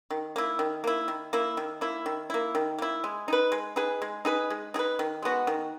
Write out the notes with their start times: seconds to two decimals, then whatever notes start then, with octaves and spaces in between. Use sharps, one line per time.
0.11 D#3
0.36 A#3 E4
0.59 D#3
0.84 A#3 E4
1.08 D#3
1.33 A#3 E4
1.57 D#3
1.81 A#3 E4
2.06 D#3
2.30 A#3 E4
2.55 D#3
2.78 A#3 E4
3.04 G#3
3.28 D#4 G#4
3.33 B4
3.52 G#3
3.76 D#4 G#4 B4
4.02 G#3
4.25 D#4 G#4 B4
4.50 G#3
4.74 D#4 G#4
4.79 B4
4.99 D#3
5.22 G#3 B3 F#4
5.47 D#3